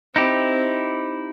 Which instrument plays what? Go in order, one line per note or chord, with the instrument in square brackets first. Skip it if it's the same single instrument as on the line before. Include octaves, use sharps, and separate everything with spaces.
[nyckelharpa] C4 [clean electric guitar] D#4 E4 G4